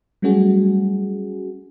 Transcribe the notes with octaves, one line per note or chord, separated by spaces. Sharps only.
F#3 G3 A3 C#4 F#4 G#4